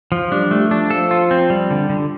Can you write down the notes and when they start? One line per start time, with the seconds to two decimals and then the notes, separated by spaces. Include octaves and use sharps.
0.12 F3
0.31 G3 D4
0.51 A3
0.71 F3 D4
0.90 A4
1.11 F4
1.31 C4
1.50 G3
1.71 D3
1.90 D3